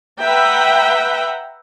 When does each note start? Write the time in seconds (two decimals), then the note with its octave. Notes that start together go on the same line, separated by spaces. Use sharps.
0.20 B4 E5 F#5 G5 A#5